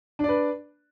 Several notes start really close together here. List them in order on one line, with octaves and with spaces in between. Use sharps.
D4 D5 B4